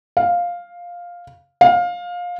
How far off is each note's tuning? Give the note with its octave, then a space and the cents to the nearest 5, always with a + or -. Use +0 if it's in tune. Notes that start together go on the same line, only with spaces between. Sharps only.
F5 +5
F5 +20